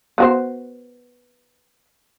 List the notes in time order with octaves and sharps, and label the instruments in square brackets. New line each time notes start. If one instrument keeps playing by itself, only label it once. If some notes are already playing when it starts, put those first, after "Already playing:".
[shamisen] B3 F#4 C5